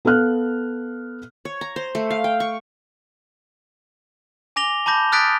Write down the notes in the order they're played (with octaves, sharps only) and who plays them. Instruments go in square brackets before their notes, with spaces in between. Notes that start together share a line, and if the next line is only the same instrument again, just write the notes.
[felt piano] B3 A4 F5 F6 F#6
[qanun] C#5
A#5
C5
A3
F5
G5
C#6
[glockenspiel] G#5 D6 A#6 F7 G7
A5 B5 D6 G6 A#6
D#6 F6 F#6 A6 B6 D7